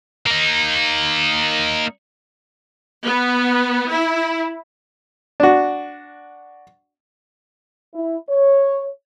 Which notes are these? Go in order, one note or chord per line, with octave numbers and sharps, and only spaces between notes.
A#3 D#4
B3
E4
D4 F#4
E4
C#5